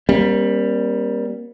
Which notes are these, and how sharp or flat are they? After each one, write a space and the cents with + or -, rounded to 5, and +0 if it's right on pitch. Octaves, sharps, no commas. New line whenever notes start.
G3 +10 A#3 +30 C#4 -40